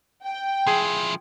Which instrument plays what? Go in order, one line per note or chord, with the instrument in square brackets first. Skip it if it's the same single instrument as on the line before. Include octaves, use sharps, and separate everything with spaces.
[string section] G5
[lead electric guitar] F3 E4 [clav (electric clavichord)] G#4